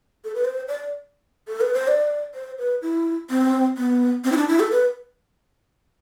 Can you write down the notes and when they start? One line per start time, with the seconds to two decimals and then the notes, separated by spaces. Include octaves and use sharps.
0.25 A4
0.35 B4
0.45 C5
0.68 D5
1.48 A4
1.61 B4
1.74 C5
1.88 D5
2.34 C5
2.58 B4
2.82 E4
3.30 C4
3.77 B3
4.24 C4
4.32 E4
4.37 D4
4.48 E4
4.60 A4
4.72 B4